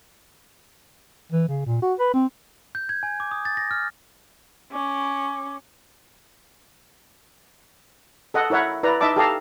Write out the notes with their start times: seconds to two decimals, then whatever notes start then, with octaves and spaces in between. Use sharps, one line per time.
1.32 E3
1.48 C#3
1.66 A#2
1.82 F#4
1.99 B4
2.13 C4
2.75 G6
2.89 G#6
3.03 G#5
3.20 D6
3.31 D#6
3.45 A6
3.57 A#6
3.71 F6
4.72 C#4 D6
8.34 A4 D#5 F#5
8.50 E4 A#4 C#5 E5 F#5
8.83 E4 B4 D5 A#5
9.01 D#4 D#5 E5 A5 D6
9.16 G4 A4 D#5 F5 A5 A#5